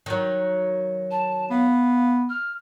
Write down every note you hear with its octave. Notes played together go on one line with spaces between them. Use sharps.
D#3 F#3
A5
B3 F5
F6